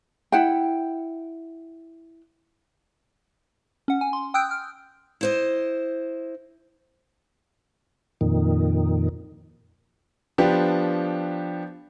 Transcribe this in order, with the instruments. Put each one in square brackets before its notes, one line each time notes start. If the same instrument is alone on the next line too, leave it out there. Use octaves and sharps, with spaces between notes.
[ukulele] E4 F#5 G5
[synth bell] C#4 F#5
G#5
C6
G5 D#6 E6 F#6 G6 D7
F6
[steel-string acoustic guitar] E4 C5 D#5
[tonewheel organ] F2 A#2 D#3
[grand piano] F3 B3 D4 G4